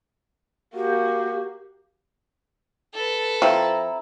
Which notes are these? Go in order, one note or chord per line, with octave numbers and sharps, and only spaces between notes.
A#3 F#4 G4
A4 B4
F3 C4 E4 A#5